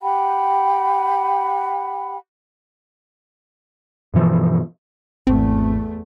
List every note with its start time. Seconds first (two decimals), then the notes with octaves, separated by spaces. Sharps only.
0.01 G4 F#5 G5 B5
4.14 G2 B2 E3 F3
5.27 G#1 E2 G#2 A3 C4